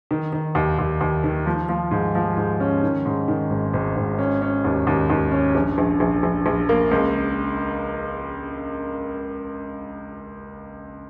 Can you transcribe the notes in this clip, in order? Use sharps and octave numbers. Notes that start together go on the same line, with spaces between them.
D#3
D#3
D#2
D#2
D#2
D#3
F3
F3
G#2
F3
G#2
C#4
D#3
G#2
D#3
G#1
G#1
G#1
C#4
C#4
D#2
D#2
D#2
C#4
A#1
A#1
A#1
A#1
A#1
A#3
C#2